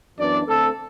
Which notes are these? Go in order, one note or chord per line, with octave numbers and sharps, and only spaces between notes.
F#2 E3 B3 D4 D5
D3 A3 C4 A4